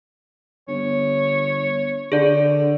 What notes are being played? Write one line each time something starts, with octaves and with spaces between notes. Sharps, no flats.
G1 C#5
D3 G#4 D5